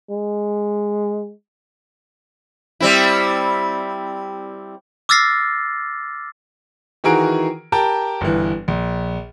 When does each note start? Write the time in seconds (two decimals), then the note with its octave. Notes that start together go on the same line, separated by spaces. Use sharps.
0.10 G#3
2.80 G3 C4 E4
5.09 D6 E6 F6 A6 A#6 C7
7.04 D#3 E3 F#4 G#4 A#4 D7
7.72 G4 A#4 G5 A5
8.21 G1 E3
8.68 A#1